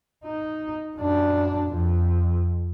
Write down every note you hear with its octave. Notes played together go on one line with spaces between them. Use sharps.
D#4
F#2 D4
F2